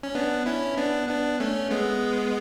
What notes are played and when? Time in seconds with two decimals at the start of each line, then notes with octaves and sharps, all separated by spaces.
0.03 C#4
0.15 B3 D4
0.46 C#4 E4
0.77 B3 D4
1.09 B3 D4
1.40 A3 C#4
1.71 G#3 B3